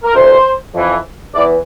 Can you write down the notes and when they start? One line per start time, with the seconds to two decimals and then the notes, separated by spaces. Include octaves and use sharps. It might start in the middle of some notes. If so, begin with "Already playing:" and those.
0.04 A#4
0.13 D2 C3 E3 C5
0.74 F2 E3
1.35 E2 E3 D5